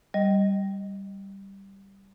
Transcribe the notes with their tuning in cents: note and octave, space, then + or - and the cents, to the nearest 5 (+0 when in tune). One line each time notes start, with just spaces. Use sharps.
G3 +0 D#5 +0